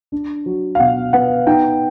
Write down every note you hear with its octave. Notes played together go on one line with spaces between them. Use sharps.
D4
F#3
F5
B2 F#5
B3 F#5
D#4 G5